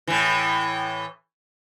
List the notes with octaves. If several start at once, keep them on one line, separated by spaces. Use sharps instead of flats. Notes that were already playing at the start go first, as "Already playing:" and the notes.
A2 E3